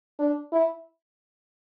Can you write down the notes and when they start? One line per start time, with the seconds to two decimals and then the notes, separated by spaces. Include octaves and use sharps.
0.19 D4
0.52 E4